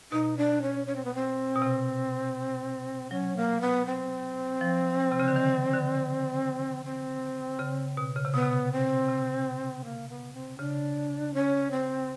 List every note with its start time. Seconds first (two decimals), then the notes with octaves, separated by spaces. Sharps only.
0.12 B2 D#4
0.37 D4
0.62 C#4
0.87 C#4
0.96 C4
1.04 B3
1.14 C4
1.55 B2
1.62 C3
3.11 F#3 C#4
3.36 A#3
3.61 B3
3.86 C4
4.61 F3
5.12 C3
5.20 C#3
5.28 D3
5.36 D#3
5.73 D3
6.85 C4
7.59 C#3
7.97 B2
8.16 C#3
8.25 C3
8.34 B2 B3
8.43 C3
8.72 C4
9.09 C3
9.84 A#3
10.09 B3
10.34 C4
10.59 C#3 D4
11.34 C#4
11.71 C4